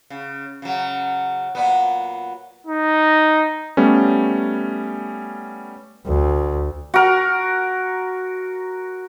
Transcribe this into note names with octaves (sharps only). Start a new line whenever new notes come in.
C#3
C#3 F#3
A#2 F#3 B3
D#4
G3 A3 B3 C#4
D2
F#4 A#4